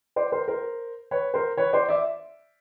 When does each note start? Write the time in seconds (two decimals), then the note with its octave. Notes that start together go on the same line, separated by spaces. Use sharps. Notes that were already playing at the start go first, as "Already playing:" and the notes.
0.16 C5 D5
0.32 A#4 C5
0.48 A#4 C5
1.11 B4 C#5
1.34 A#4 C5
1.57 B4 C#5
1.73 C5 D5
1.89 D5 E5